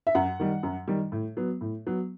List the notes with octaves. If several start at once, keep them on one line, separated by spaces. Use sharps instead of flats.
E5
F#2 F#5
D#3 G3
F#2
D#3 G3
A2
F#3 B3
A2
F#3 B3